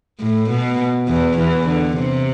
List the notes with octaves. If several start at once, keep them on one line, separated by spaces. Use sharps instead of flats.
A2
B2
E2 E3
E2 E3
D3
C3